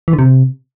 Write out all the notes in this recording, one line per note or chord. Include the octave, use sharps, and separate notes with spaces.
E3
D3
C3